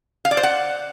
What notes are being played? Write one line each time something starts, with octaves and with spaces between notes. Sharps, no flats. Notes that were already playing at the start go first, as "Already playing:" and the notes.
F5
D5
C5
F#5